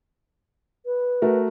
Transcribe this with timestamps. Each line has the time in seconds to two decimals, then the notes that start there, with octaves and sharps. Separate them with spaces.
0.86 B4
1.22 A3 F#4 A#4